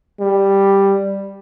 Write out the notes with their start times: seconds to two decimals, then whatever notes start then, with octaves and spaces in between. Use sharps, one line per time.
0.20 G3